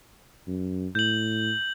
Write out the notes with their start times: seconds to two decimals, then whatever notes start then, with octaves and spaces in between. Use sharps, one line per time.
0.47 F#2
0.95 A2 G6 F#7